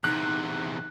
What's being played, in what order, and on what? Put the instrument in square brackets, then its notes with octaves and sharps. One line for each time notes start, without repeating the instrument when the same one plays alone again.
[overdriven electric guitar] E2 C3 [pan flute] D#4 [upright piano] F#6